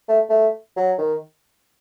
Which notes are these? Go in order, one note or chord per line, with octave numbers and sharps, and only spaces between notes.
A3
A3
F#3
D#3